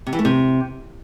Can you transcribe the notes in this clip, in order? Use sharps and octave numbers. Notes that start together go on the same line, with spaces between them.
C3
E3
A3
C3